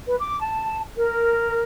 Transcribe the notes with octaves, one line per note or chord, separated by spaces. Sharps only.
B4
D6
A5
A#4